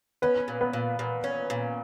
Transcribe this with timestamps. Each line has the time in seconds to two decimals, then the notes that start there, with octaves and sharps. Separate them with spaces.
0.22 B3 C#4 B4
0.48 A#2
0.61 B3 B4
0.73 A#2
0.99 A#2
1.24 C#4
1.50 A#2